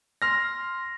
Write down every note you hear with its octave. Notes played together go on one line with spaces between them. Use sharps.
C6 F6 A#6